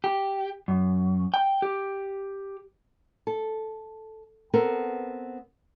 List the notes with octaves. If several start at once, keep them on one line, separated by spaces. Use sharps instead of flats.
G4
F#2
G5
G4
A4
B3 C4 A4 A#4